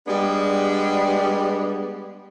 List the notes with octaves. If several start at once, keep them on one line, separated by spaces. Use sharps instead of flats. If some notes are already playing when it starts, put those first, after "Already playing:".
G3 G#3 B3 D4 G4